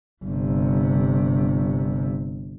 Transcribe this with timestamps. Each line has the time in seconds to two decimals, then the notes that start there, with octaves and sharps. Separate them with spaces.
0.25 G1 C3